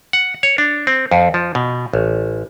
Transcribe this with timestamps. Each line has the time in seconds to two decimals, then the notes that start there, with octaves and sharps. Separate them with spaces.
0.13 F#5
0.43 C#5
0.58 D4
0.87 C4
1.11 F2
1.34 F3
1.55 B2
1.93 A1